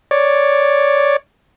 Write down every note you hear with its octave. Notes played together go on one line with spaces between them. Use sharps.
C#5 D5